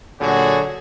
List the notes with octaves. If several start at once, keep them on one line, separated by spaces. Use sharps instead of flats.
A#2 D3 F#3 F#4 G#4